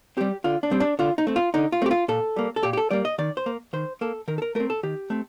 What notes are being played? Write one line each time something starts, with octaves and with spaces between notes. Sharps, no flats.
G3 C4 G4
D3 F4
D4
G3 C4
D4
D3 F4
D#4
A3 C4
F4
D3 D#4
F4
A3 C4 G4
F4
A#2 A4
G3 A#3
A4
A#2 G4
G4
A4
G3 A#3 D5
D#5
D#3 D5
C5
A#3
D#3 C5
A#3 A4
D#3 A#4
A4
A#4
A3 C4 A#4
A4
D#3 G4
A3 C4